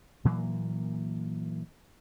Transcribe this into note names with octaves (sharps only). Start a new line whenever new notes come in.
A#2 E3 F#3 A#3